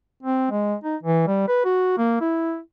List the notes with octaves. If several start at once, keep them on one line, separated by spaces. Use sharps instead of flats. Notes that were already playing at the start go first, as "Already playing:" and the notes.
C4
G#3
D#4
E3
G3
B4
F#4
A#3
E4